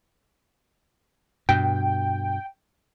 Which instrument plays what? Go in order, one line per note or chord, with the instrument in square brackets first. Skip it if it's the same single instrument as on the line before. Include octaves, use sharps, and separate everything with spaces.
[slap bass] G2 B2 [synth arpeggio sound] G5